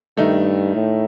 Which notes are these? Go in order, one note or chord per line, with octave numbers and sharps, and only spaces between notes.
G2 D#3 A3 D#4
A2